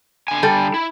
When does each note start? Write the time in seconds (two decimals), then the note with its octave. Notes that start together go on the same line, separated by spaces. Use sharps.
0.28 D3 G#5
0.43 G3 A4
0.74 E4